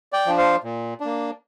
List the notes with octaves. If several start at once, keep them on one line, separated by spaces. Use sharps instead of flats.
D5 G5
F3 D4
C5 F5
A#2
A#3 D4